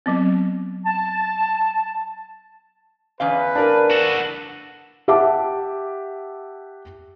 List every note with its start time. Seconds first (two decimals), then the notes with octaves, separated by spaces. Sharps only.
0.06 F#3 B3 C4
0.86 A5
3.20 E2 C#4 B4 F5
3.55 D4 A#4
3.91 F#4 A4
5.08 G4 E5 F#5 A5 D6